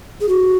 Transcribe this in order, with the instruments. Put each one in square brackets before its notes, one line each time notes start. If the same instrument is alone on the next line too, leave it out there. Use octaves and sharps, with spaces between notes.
[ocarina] G#4
F#4